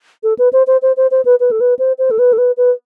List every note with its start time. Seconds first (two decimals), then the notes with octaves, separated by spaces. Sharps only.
0.23 A4
0.38 B4
0.53 C5
0.67 C5
0.82 C5
0.97 C5
1.11 C5
1.25 B4
1.40 B4
1.51 A4
1.60 B4
1.79 C5
1.98 C5
2.11 A4
2.19 B4
2.33 A4
2.38 B4
2.57 B4